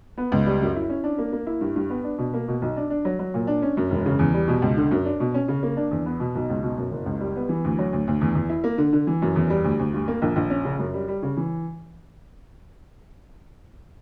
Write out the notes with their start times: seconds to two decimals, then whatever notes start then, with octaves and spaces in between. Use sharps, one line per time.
0.18 B3
0.32 C#2
0.46 G3
0.62 F#2
0.76 E4
0.90 C#4
1.04 D4
1.18 A#3
1.32 A#3
1.47 E4
1.61 G2
1.76 G2
1.90 B3
2.04 D4
2.18 B2
2.34 A#3
2.48 B2
2.62 B1
2.77 D4
2.90 D4
3.05 F#3
3.19 F#3
3.34 A#2
3.47 D4
3.62 C#4
3.77 F#2
3.90 E1
4.06 C#3
4.19 E2
4.34 G3
4.48 B2
4.62 C#2
4.77 D3
4.91 F#2
5.05 D4
5.20 B2
5.34 C#4
5.48 C#3
5.63 A#3
5.77 D4
5.91 E2
6.06 B3
6.20 B2
6.35 B1
6.50 C#2
6.63 B2
6.77 F#2
6.92 F#1
7.06 C#2
7.21 G3
7.36 B3
7.49 E3
7.64 D2
7.78 F#3
7.93 D2
8.07 D2
8.21 E2
8.35 E2
8.49 E4
8.64 A#3
8.78 D3
8.93 D3
9.07 E3
9.22 F#2
9.36 E2
9.50 G3
9.64 D2
9.79 D2
9.94 G2
10.08 A#3
10.22 A#1
10.36 A#1
10.50 C#4
10.65 C#3
10.79 F#2
10.94 G3
11.08 G3
11.23 C#3
11.37 E3